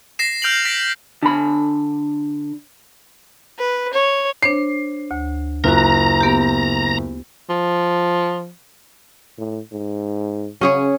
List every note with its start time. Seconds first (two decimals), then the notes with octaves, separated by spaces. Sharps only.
0.19 A#6 C7 E7
0.42 F6 G6 D7 F7 F#7
0.65 A#6 B6 D7
1.23 D3 B5
3.59 B4
3.93 C#5
4.43 D4 C5 C#5 C7
5.11 D2
5.64 F#1 F4 F#4 A#5
6.21 B3 G4
7.50 F3
9.38 A2
9.72 G#2
10.61 C#3 C#4 G#4 C#5